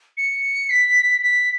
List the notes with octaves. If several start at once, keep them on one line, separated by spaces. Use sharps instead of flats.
C#7
B6
B6